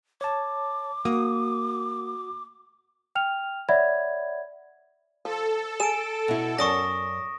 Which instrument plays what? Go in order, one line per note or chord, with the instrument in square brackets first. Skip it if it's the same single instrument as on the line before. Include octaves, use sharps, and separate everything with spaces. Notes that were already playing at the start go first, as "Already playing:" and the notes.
[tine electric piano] C#5 A5 [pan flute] D6
[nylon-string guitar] A#3 [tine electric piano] F#4 D#6
[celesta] G5 F6 F7
C#5 D5 E5 F#5 B5 G#6
[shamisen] F3 [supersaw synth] A4
[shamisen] G#4 G#5 [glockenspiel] D7 E7
[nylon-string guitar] B2 E4
[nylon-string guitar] F#2 D5 [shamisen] C#4 [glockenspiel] C#6 D#6 A#6